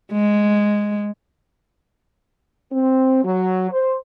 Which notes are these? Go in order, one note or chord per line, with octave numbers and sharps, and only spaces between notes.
G#3
C4
F#3
C5